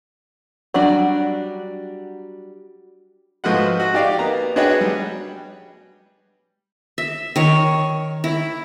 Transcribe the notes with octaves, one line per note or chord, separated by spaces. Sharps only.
F#3 G3 D4 F#4
G#2 F3 A3 F#4 B4 F#5
F#4
D#4 G4 D5 F5
A#3 B3 A#5
D4 F#4 G#4 B4 C#5 G5
G3
E5
D#3 C#5
E4